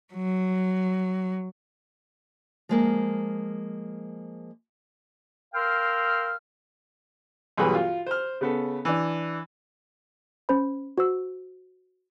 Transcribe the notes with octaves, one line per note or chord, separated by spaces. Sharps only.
F#3
F3 G#3 A#3
A#4 F5 G5 C6 E6 F6
B1 G2 E3 F#3 G#4 B4
F4
C5 F6
C#3 B3 A4
E3 D4
C#4 C5 B5
F#4 C5 E6